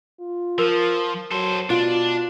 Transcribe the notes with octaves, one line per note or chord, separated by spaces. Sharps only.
F4
F3 A#4
F#3 A4 C5
B2 D4 F4